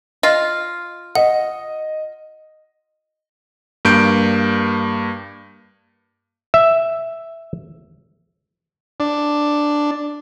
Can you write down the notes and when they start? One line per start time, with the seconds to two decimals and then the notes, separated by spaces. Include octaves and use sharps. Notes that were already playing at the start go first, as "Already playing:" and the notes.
0.23 F4 D#5
1.15 D#5 F#5
3.85 G2 A#3 G6 D7
6.54 E5
9.00 D4